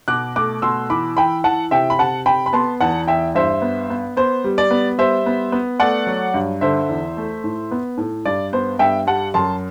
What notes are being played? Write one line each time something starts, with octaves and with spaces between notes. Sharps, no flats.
B2 D6 F#6
A3 D6 F#6
B2 C6 E6
E3 B5 D6
E3 G5 B5
E3 F#5 A5
C3 E5 G5
B5
C3 F#5 A5
C3 G5 B5
B5
B3 A5 C6
E2 F#5 A5
E2 E5 G5
G2 C5 E5
B3
B3
B3 C5
G3
D5
B3
G3 C5 E5
B3
B3
A3 D5 F#5
F#3
G2
D3 C5 E5
E2
A3
A2
B3
A2
G2 D5
B3 C5
G2 E5 G5
G3 F#5 A5
F#2 A5 C6